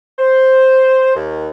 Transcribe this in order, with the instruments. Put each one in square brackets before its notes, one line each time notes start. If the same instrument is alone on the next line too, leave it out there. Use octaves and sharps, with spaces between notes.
[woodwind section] C5
D#2